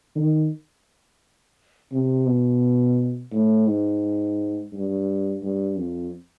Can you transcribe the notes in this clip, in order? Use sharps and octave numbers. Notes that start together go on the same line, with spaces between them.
D#3
C3
B2
A2
G#2
G2
G2
F2